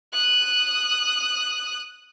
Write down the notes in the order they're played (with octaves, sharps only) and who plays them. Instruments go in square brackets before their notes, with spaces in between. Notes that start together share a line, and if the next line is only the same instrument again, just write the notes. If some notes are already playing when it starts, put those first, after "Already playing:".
[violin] D#6 F#6